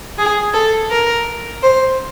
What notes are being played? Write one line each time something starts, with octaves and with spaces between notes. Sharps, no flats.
G#4
A4
A#4
C5